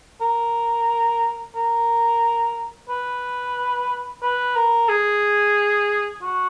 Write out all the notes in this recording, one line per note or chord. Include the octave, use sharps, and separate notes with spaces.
A#4
A#4
B4
B4
A#4
G#4
F#4